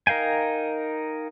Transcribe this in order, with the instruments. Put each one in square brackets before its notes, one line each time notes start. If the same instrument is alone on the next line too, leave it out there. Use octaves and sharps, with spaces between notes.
[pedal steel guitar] D#4 A#4 F5 G5 G#5